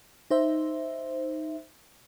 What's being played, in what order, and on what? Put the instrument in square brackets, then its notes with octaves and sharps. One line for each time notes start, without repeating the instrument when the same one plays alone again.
[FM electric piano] D#4 C5 E5